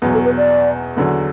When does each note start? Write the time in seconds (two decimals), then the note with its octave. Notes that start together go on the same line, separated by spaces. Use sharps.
0.02 E2 B2 F#3
0.14 A4
0.25 B4
0.38 D5
0.97 E2 D3 F#3